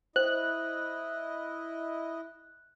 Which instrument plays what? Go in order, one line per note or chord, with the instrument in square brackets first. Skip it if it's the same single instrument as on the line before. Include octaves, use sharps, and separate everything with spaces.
[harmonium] E4 D#5 [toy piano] C5 [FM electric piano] F#6